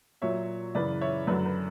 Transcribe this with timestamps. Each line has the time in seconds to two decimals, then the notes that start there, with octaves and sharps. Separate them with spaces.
0.22 A#2 F#3 C#5 E5
0.75 F#2 C#3 E3 B4 D5
1.01 C#5 E5
1.27 F#2 D3 F#3 B4 D5
1.46 B4